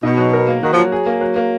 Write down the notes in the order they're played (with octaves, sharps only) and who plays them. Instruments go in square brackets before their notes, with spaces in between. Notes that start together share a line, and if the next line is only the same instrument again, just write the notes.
[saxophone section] B2 [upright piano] D#4
[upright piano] F#3
A#4
A#3
[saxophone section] D#3 [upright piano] F#4
[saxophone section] F3
[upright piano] F#3
G#4
A#3
F#3
A#3